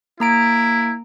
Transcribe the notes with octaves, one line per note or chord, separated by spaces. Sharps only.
A#3 E4 A#5 D7